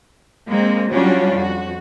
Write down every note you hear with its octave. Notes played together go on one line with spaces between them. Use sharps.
G#3 A#3 C4
F#3 G3 C#4 D4 F4 F#4
F2 F#4